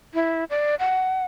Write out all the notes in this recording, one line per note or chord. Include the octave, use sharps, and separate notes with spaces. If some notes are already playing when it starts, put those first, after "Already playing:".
E4
D5
F#5